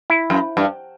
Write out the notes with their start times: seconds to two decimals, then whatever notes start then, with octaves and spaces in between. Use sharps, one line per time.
0.10 E4
0.30 F#2
0.57 G2